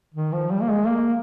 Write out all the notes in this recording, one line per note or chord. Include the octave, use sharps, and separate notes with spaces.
D#3
F3
G3
A#3
G#3
A#3